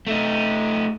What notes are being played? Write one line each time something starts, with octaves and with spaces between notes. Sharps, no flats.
A3 D#4